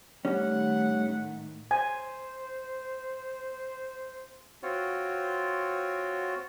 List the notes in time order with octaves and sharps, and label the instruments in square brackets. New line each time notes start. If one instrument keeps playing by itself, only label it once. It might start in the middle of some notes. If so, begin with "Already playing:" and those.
[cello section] A2 D#3 A3 [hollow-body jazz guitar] G3 C#4 [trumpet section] F#5
[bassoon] C5 [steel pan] G#5
[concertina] C4 F4 F#4 C#5